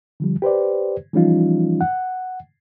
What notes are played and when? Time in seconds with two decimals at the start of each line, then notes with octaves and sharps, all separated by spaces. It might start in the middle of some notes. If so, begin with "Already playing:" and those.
0.20 D3 F3 G3
0.42 G4 B4 C5 D5
1.13 E3 F3 G3 C#4 D#4 F4
1.81 F#5